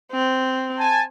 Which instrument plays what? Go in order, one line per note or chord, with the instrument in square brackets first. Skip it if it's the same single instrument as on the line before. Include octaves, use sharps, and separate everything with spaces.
[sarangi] C4
[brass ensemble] G#5 A5